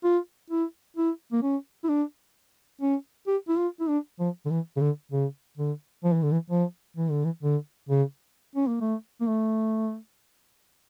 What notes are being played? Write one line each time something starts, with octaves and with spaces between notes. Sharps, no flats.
F4
E4
E4
A#3
C#4
E4
D4
C#4
G4
E4
F4
E4
D4
F3
D3
E3
C#3
D3
C#3
D3
F3
E3
D3
E3
F3
E3
D3
E3
D3
C#3
C#4
A#3
A3
A#3
A3